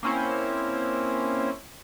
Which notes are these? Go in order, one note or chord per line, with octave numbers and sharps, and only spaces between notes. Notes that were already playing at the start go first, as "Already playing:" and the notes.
A#3 C4 C#4 E4 C5